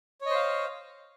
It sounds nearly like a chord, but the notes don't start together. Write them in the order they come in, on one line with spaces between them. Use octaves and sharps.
C#5 D#5 C5 F5